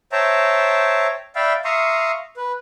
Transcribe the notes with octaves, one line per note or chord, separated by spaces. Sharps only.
C5 C#5 E5 G5 A5 A#5
D5 E5 F5 G5 B5
E5 F5 A#5 C6 C#6 D#6
B4